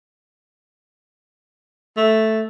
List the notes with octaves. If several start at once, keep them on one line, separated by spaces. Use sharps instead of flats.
A3